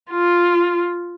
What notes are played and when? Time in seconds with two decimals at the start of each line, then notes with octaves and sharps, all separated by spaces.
0.11 F4